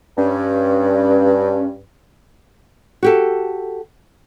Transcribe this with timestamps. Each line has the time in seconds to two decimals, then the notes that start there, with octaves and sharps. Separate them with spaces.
0.18 G2 C#4
3.03 F#4 G4 A4